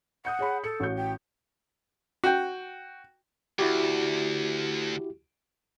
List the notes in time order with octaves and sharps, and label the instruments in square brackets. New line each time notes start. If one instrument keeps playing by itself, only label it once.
[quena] F#5 [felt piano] D#6 G6 C#7
[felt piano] G#4 C#5 B5
[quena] A4 [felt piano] C#7
[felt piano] A1 F#4 G6
[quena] G5
[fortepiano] F#4 G5
[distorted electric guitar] D2 [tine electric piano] E4 F#4 G4